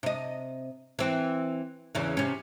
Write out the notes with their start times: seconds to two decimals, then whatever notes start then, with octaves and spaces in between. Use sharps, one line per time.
0.03 C3 D#5
0.99 E3 C4
1.95 E2 C#3 E3
2.17 C3 C#4